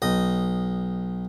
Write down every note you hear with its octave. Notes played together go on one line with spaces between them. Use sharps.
B1 D#5